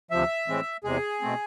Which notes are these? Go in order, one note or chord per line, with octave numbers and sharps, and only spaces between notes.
D2 C3 F3 E5
A2 E3 G#3 C4
E2 C3 G#3 G#4
B2 A3 C4